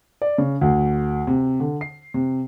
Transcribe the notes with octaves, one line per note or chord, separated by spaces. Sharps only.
D5
C#3
D2
C3
D3
C7
C3